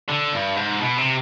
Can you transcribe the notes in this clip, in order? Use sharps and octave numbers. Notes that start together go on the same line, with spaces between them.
D3
G2
G#2
B2
C3